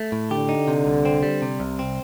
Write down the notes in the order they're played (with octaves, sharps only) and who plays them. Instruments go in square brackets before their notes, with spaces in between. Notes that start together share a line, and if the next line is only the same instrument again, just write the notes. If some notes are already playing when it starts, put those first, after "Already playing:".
Already playing: [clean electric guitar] A3
A2
[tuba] D3 [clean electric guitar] G4
[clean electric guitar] D#4
C3
C2
C4
G3
C3
C2
C4